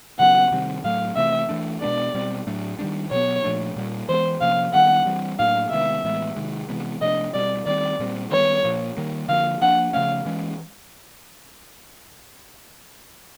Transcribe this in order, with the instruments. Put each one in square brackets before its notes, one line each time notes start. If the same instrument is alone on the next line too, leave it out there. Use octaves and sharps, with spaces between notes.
[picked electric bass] C#3 F#3 B3 [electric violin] F#5
[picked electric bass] C3 D#3 G3 C4
[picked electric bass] A2 F#3 A3 [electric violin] F5
[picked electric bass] C3 E3 A3 C4 [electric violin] E5
[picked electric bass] E3 A3 D4
[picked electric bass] B2 G#3 B3 D4 [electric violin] D5
[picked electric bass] B2 G3 C4
A2 F#3 A3 D4
D#3 G3 B3 D4
[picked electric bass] B2 F#3 B3 [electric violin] C#5
[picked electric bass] A#2 F3 A3 D4
A#2 G3 A#3
[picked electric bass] E3 G#3 B3 [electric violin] C5
[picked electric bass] C3 F3 A#3 C#4 [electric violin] F5
[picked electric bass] D#3 G3 B3 [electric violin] F#5
[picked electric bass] E3 G3 C4
[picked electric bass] A2 F#3 A#3 D4 [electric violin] F5
[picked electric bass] C3 D#3 G#3 B3 [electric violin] E5
[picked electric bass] A2 E3 G#3 B3
C3 D#3 G#3
C3 E3 G#3 B3
[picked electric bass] C3 F3 A3 D4 [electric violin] D#5
[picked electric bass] B2 G3 C4 [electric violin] D5
[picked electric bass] D#3 G3 C4 [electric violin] D5
[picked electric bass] A#2 G3 C4
[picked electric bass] D#3 G3 B3 [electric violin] C#5
[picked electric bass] A#2 F3 A#3
D#3 G3 A#3
[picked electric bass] D3 F3 A#3 [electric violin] F5
[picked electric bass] F3 A#3 D4 [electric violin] F#5
[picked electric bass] C#3 F3 A3 C#4 [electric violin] F5
[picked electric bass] E3 G#3 C#4